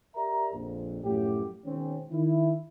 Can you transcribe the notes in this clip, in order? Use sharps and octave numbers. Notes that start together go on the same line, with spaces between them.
G4 A#4 D5 E5 A#5
A#1 F2
F#2 A2 F3 F#3 G4
B2 D#3 G#3 C4 C#4
D#3 E4